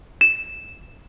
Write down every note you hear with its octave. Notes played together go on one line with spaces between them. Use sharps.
E7